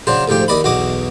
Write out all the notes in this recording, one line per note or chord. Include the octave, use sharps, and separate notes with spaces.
C#3 F#3 D4 C5 A5
D2 G#2 F3 G4 G5
D#2 D5 D#5 B5
B1 E2 B2 F#4 D#5 D6